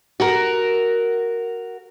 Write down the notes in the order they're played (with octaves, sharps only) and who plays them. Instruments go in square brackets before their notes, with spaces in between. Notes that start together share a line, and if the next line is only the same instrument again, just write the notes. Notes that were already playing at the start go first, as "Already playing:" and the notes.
[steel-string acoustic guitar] F#4 A#4